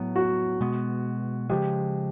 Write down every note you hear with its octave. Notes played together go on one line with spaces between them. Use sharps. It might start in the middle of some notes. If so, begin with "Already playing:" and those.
Already playing: A2 F#3 B3
F#4
B2 G#3 B3
C#3 F3 G#3 G4